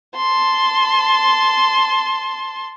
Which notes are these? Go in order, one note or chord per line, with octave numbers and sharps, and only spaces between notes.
A5 C6